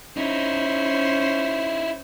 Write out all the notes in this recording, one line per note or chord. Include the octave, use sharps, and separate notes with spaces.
C#4 D#4 E4 C5